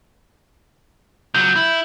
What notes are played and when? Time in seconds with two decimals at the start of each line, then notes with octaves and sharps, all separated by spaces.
1.35 C#2 F#3 G6
1.56 E4